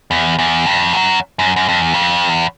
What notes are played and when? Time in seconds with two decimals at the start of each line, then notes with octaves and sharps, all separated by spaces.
0.11 E2
0.39 E2
0.66 F2
0.93 F#2
1.39 F#2
1.56 F#2
1.69 F2
1.81 E2
1.94 F2
2.29 E2